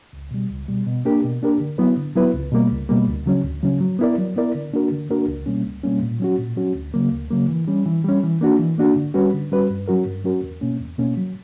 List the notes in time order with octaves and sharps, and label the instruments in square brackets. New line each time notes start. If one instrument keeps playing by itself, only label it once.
[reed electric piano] C#2
B2 G3
C#2
B2 G3
B2
A#3 D4 G4 A#4
B2
A#3 D4 G4 A#4
D3
F#3 B3 E4 B4
D3
F#3 B3 E4 B4
C#2
B2 G3 A#3
C#2
B2 G3 A#3
D2
C#3 F#3 C#4
D2
C#3 F#3 C#4
F#3
B3 E4 A#4 D5
F#3
B3 E4 A#4 D5
D3
A#3 D4 F#4 A#4
D3
A#3 D4 F#4 A#4
C#2
B2 G3 A#3 C#4
C#2
B2 G3 A#3 C#4
A#2
F#3 C#4 F#4
A#2
F#3 C#4 F#4
D2
C#3 F#3 A#3
D2
C#3 F#3 A#3
E3
G3 C#4
E3
G3 C#4
E3
A#3 D4 F#4
E3
A#3 D4 F#4
D3
G3 C#4 F#4 B4
D3
G3 C#4 F#4 B4
G2
F#3 C#4 F#4 A#4
G2
F#3 C#4 F#4 A#4
E2
B2 A#3 C#4
E2
B2 A#3 C#4
F#3